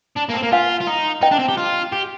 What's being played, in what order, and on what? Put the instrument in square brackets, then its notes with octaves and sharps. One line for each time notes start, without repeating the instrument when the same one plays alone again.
[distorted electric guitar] D4
A#3
C4
A#3
[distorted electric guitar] F4 [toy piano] F5 G#5
[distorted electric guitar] F4
D#4
[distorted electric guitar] D#4 [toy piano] D#5 G5
[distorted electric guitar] D4
C4
G4
F4
G4